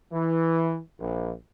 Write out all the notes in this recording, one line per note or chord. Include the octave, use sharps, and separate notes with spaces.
E3
A#1